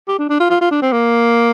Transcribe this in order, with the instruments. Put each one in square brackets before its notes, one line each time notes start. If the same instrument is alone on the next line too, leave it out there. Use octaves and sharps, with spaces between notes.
[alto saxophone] G4
D4
D4
F4
F4
F4
D4
C4
A#3